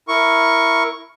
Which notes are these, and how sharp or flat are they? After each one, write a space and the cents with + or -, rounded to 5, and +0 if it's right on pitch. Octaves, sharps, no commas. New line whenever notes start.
E4 +0 A#4 +0 C#6 +0